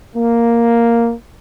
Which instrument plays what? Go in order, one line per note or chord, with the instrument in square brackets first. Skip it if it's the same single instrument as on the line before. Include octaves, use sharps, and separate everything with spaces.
[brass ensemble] A#3